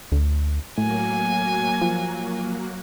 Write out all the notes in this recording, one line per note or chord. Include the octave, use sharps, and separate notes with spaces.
D2
A2 F#3 A#3 F#4 G#5
F3